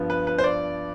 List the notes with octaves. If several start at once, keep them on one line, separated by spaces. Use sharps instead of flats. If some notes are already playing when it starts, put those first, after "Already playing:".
Already playing: G2 F3 B3
B4
B4
C5
D5